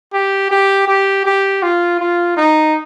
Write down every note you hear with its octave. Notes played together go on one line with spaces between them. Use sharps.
G4
G4
G4
G4
F4
F4
D#4